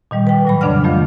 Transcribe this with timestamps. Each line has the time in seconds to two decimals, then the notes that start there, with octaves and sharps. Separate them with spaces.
0.11 A#2 D#3 G3
0.27 B4 G5
0.45 A2 F#3 B5
0.61 F2 C#3 D4 D5 F#5 F6
0.84 D#3 F3 A3 F4